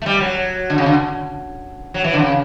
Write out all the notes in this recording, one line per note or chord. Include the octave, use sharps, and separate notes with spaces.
A3
G3
F#3
D3
C#3
D3
F#3
E3
D3
C#3